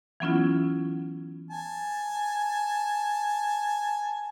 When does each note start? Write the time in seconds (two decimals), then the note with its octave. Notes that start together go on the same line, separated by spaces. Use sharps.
0.20 E3 F#3 B3 C#4 E4 F4
1.51 G#5 A5